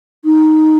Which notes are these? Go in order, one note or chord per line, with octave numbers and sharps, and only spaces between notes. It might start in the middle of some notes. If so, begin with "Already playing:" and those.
D#4